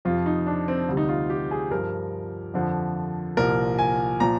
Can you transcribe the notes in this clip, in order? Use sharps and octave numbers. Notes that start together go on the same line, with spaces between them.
F2 C3 F3 F4
D#4
D4
C4
D2 C3 G3
D#4
F4
G4
G#4
G2 F3 A#4
F2 D3 F3
C2 A#2 F3 A#4
G#5
A#2 F3 A#5